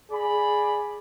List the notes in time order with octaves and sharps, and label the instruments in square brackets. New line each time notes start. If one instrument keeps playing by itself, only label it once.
[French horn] G#4 [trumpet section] D5 B5